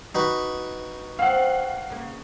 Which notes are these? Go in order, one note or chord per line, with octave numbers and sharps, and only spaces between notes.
D#4 F#4 B4
C4 F5 F#5
C#3 A#3